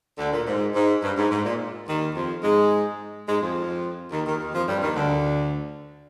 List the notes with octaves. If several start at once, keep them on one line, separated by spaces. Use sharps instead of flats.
D2 D3
A#2
G#2
G#2
G2
G#2
G#2
A#2
D#2 D#3
F2 F3
G#2 G#3
G#2 G#3
F2 F3
D#2 D#3
D#2 D#3
D#2 D#3
F2 F3
G2 G3
D#2 D#3
D2 D3